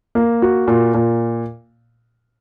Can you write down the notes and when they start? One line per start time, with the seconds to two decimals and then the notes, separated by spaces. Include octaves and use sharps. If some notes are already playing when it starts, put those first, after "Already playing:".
0.15 A#3
0.42 F#4
0.67 A#2
0.94 A#2